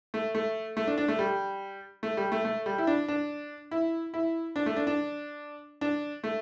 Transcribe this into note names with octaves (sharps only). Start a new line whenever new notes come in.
A3
A3
A3
D4
D4
A3
G3
A3
G3
A3
A3
G3
E4
D4
D4
E4
E4
D4
A3
D4
D4
D4
A3